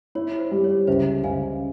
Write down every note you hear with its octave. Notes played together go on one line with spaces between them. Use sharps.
E4 C#5
C5
G3
C#5
C#2 C5 E5
C#2 F5 G#5